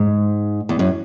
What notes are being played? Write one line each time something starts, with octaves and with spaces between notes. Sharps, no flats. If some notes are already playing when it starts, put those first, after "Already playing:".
Already playing: G#2
E2
F#2